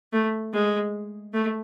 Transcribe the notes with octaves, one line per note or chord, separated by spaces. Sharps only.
A3
G#3
A3